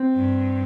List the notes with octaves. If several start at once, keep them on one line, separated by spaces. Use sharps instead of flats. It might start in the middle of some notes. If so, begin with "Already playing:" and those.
Already playing: C4
G2